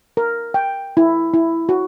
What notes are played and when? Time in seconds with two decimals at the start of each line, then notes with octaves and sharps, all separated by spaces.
0.17 A#4
0.54 G5
0.97 E4
1.34 E4
1.69 F#4